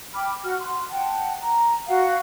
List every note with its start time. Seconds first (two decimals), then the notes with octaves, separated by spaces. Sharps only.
0.14 G5 B5 D6 F6
0.44 F#4 F#5 F6
0.59 C6
0.90 F#5 G5 A5
1.42 A#5
1.88 F#4 F5 F#5